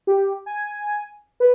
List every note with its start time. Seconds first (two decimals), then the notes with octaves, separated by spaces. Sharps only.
0.07 G4
0.46 G#5
1.40 B4